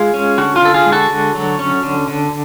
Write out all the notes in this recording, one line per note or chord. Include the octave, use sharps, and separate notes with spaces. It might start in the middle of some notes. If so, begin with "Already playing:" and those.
Already playing: G#3 F4 G#4
C#4
D3 F#4
F4
D3 A4
F4 G#4
G#3
F#4 A4
D3
F#3
C#4
D3
D3